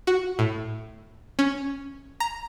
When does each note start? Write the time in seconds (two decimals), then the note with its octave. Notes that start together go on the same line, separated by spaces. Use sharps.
0.07 F#4
0.39 A2
1.39 C#4
2.20 A#5